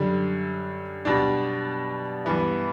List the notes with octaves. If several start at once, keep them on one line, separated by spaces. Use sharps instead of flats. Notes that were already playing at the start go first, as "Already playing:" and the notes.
Already playing: F#2 D3 G3
B2 G3 D4
G2 E3 B3 E4